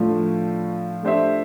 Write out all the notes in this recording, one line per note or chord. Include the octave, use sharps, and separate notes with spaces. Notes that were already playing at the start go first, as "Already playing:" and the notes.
Already playing: A2 F3 A3 D4 F4
A3 D4 G4 C5 E5